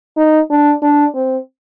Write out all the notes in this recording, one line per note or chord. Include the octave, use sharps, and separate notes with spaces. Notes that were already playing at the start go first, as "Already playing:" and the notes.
D#4
D4
D4
C4